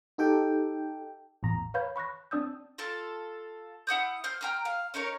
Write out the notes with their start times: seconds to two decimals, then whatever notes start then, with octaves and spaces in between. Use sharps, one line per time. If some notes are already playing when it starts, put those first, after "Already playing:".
0.18 D#4 G4 A4 G5
1.43 A1 E2 A#5
1.74 B4 C#5 F5 B5 G6 G#6
1.96 B5 C#6 F#6 A#6
2.31 C4 D4 D5 D#6 E6 G6
2.78 F4 A4 A5
3.87 E4 F#5 D#6 G6
4.24 C5 F6
4.41 G5 A#5 F6
4.65 F5
4.94 C#4 D#4 A#4 C#5